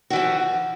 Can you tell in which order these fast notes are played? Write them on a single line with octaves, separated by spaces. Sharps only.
F#4 E3 F3